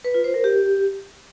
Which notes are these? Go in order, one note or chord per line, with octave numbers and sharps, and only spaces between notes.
B4
F4
C5
A#4
G4